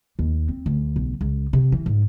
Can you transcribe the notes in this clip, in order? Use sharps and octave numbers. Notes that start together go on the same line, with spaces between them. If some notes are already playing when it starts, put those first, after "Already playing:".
D#2
C4
D2
B1
C#2
C3
E3
G#2